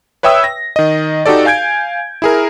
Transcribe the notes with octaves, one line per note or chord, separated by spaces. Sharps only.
B4 C#5 E5 G5 D#6 E6
A#6
D#3 D#5
D#4 F#4 G4 A4 D5
F5 G#5 G6 G#6 D7
E4 G#4 A#4